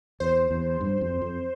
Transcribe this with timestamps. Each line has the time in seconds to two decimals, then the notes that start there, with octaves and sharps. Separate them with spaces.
0.20 E2 C5
0.51 E2
0.81 G2
1.01 F2
1.21 F2